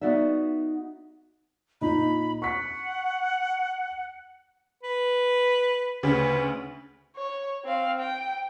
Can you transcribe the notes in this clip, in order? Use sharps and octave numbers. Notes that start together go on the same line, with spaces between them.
B3 D#4 F#4 D5 E5
A#2 D#4 B5
F#5 C#6 B6
B4
D2 C#3 B4
C#5
C4 F5
G5